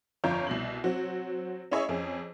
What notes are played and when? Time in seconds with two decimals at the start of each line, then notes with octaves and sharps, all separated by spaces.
0.24 G1 F2 F4 C#5 A#5 G6
0.47 C2 B2 F#7
0.84 F#3 C4 F#4
1.71 C#4 E4 G#4 C#5 D#5 E5
1.89 F2 C#4 G#4